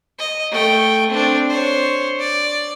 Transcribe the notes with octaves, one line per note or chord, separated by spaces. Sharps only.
D#5
A3 G5
C4 D4
C5 C#5
D5